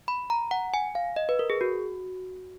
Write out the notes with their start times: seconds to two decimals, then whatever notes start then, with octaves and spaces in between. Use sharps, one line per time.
0.08 B5
0.30 A#5
0.51 F#5
0.74 G#5
0.95 F5
1.16 D#5
1.29 B4
1.39 A#4
1.50 G#4
1.61 F#4